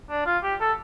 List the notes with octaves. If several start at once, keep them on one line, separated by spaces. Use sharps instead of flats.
D4
F4
G4
A4